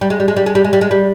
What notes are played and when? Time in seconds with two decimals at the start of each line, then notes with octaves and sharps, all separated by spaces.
0.01 G3
0.10 G#3
0.20 G3
0.28 G#3
0.37 G3
0.46 G#3
0.55 G3
0.64 G#3
0.73 G3
0.81 G#3
0.91 G3